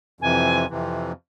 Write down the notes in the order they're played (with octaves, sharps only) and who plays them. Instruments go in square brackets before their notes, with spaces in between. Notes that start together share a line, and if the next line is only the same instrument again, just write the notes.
[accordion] F2 C3 E3 [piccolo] G#5
[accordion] F2 C3 E3